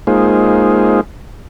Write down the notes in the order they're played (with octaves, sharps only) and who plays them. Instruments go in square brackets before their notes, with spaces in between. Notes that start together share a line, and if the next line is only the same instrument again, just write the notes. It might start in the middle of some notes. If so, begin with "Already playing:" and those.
[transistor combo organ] G#3 A#3 D#4 F4 G#4 C5